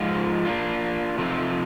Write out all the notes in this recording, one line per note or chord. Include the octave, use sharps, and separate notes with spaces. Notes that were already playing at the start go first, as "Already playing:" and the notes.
Already playing: G#2 F3 G#3 F4
A#3 D4 F4
C3 F3 A3 C4 D#4